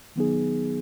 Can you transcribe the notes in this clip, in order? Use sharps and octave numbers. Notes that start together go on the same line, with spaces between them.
D#3 F#3 B3 D#4 G#4